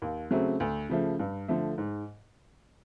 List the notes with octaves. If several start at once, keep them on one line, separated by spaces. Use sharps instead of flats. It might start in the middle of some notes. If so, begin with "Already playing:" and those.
D#2
C#3 F#3 A3 C4
D2
C#3 F3 A3
G2
D3 F3 A3
G#2